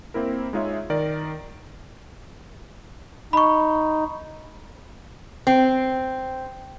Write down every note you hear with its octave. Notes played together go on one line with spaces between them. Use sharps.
A#3 C4 E4 A#4
G#3 D#4 F4 G#4 C#5 E5
D#3 A#4 D5
D#4 B5 C#6
C4